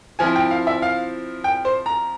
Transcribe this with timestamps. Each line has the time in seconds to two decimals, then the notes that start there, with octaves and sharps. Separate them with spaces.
0.19 F3 C4 E4 G#5
0.36 G5
0.51 F5
0.67 E5
0.82 F5
1.44 G5
1.65 C5
1.86 A#5